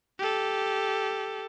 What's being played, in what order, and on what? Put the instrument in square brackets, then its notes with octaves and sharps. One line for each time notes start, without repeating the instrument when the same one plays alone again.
[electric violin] G4 A4